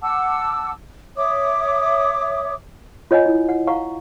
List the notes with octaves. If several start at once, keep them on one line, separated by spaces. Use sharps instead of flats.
F#5 A5 D6 E6
C#5 E5 D6 D#6
F4 C#5 D#5 F#5 G#5
E4
F#5
F5 F#5 A#5 C#6